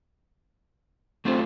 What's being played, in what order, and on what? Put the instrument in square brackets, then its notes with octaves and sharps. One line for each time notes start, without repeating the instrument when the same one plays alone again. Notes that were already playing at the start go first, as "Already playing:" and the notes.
[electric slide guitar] A3 D4 F4 [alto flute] C4